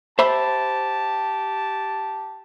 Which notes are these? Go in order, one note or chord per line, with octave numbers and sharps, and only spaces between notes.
G4 C5 E5 A5 B5